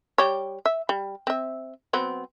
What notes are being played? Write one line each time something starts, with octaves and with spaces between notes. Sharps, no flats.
G3 G4 C#5
E5
G3
C4 E5
F#3 B3 C4